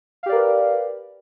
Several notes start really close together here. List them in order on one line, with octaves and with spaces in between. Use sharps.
F5 G4 D5 A#4 B4